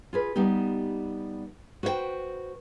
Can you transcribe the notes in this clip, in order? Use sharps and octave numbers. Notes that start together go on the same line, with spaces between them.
F4 G#4 B4
G3 B3 D#4 G4
F#4 B4 C5 D#5 G5